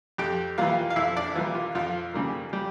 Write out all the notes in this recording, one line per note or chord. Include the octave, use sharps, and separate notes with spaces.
F2 G4 G5
E3 G3 A#3 F4 F5
F5
F2 E4 E5
D4 D5
E3 G3 A#3 F4
F4
F2 F4
C#3 G3 A#3
G3 G4